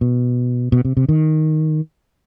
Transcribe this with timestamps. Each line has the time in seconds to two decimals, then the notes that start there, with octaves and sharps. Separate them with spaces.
0.01 B2
0.72 B2
0.85 C3
0.97 C3
1.09 D#3